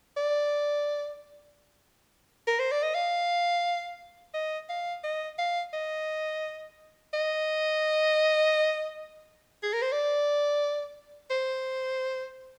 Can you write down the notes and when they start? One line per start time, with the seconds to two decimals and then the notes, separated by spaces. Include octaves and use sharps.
0.17 D5
2.47 A#4
2.59 C5
2.71 D5
2.82 D#5
2.95 F5
4.34 D#5
4.69 F5
5.04 D#5
5.38 F5
5.73 D#5
7.13 D#5
9.63 G#4
9.73 A#4
9.82 C5
9.92 D5
11.30 C5